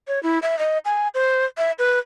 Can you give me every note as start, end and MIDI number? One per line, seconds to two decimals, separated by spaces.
0.08 0.22 73
0.23 0.39 64
0.42 0.58 76
0.59 0.78 75
0.85 1.08 80
1.15 1.45 72
1.58 1.72 76
1.79 1.99 71